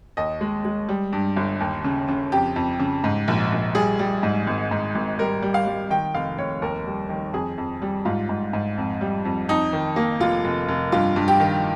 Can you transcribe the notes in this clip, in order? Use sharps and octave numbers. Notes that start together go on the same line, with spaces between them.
D#2 D#5
G#3
G#3
G3
G2
G1
D#2
C#3
C#3
F2 G4
F2
C#3
G#2
A#1
A#1
G3 G#4
G3
G#2
G#1
G#2
G#1
G3 A#4
G3
F5
G3
D#3 G5
F1 F5
F1 C#5
D#2 A#4
G3
D#3
F2 G#4
F2
G3
G#2 F4
G#2
G#2
F2
G3
F2
F2 D#4
D#3
A#3
F1 F4
F1
F1
G2 F4
G2
G4
D#3